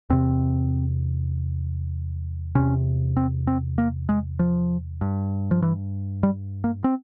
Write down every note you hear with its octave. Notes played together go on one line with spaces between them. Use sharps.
E2 C3 C4
E2 C3 C#4
C4
C4
A#3
G#3
F3
G2
F3
E3
G3
A#3
C4